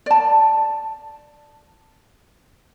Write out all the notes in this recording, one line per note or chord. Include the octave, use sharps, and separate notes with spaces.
D5 A5